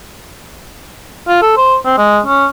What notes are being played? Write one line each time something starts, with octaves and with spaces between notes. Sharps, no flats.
F4
A4
C5
C4
G#3
C#4